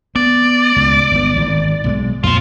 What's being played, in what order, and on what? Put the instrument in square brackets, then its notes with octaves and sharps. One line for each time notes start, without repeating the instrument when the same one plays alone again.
[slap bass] B3 [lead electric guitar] D5
[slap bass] C#2 B2
G1 B3
G#1 G#2
B1 G3 G#3
[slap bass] F2 A#2 [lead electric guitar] F4 C5